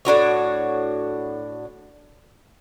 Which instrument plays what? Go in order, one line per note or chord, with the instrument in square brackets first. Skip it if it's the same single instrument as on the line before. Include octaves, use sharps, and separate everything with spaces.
[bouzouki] A2 D4 F#4 C#5